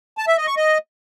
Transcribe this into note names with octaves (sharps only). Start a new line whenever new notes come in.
A5
E5
D#5
C#6
D#5